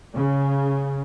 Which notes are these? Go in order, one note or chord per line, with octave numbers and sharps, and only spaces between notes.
C#3